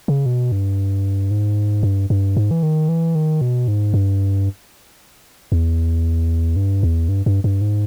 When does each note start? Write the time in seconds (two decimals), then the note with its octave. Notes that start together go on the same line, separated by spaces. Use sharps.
0.08 C#3
0.26 B2
0.52 G2
1.31 G#2
1.83 G2
2.10 G2
2.37 G#2
2.51 E3
2.63 D#3
2.89 E3
3.15 D#3
3.41 B2
3.68 G#2
3.94 G2
5.52 E2
6.56 G2
6.83 E2
7.09 G2
7.26 G2
7.44 G2
7.61 G#2